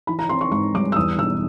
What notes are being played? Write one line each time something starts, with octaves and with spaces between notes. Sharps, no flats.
E3 B5
A#5
C4 C6
C#6
G#2 C#6
G3 D6
E6
E2 D#6
E1 E6